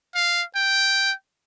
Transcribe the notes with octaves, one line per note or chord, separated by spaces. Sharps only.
F5
G5